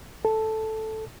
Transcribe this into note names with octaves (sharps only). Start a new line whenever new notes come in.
A4